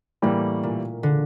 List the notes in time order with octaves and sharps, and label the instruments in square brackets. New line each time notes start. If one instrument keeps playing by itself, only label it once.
[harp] A2 [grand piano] E3 G3 A#3
[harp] A#2
D3